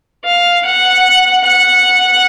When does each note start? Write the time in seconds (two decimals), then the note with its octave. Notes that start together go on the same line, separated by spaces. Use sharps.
0.24 F5
0.65 F#5
1.44 F#5